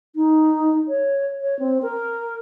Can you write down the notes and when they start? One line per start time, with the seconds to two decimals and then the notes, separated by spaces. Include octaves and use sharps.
0.16 D#4
0.88 C#5
1.41 C#5
1.59 C4
1.82 A#4